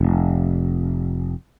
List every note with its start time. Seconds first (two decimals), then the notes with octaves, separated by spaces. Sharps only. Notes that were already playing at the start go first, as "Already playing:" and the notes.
0.01 F1